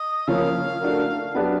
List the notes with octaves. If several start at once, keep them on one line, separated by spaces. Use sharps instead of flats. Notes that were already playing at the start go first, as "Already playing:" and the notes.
Already playing: D#5
C#3 F3 A#3 C#4 F5
A3 D4 F#4 A#4
F#3 B3 D4 G4